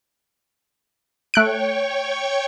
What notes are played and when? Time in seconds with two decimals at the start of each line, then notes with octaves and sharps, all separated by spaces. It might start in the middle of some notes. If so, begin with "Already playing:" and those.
1.34 A3 C#5 G5 C#6 F#6 D7